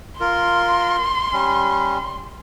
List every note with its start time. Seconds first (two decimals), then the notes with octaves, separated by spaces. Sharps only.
0.20 F4 A#4 C6
1.33 G3 C#4